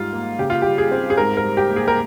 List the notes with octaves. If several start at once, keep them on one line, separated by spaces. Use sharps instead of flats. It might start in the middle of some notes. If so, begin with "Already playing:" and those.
Already playing: G#2 G3 F4
A#3
C#3 G4
F4
G3 G4
G#4
C4
G#4
G#2 A#4
A#4
G3
G4
A#3
G#4
A#4